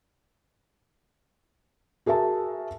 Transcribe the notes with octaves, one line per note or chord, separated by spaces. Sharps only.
F#4 G#4 A#4 E5 A5